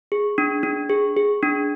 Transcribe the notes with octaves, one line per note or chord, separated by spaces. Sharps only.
G#4
D4
D4
G#4
G#4
D4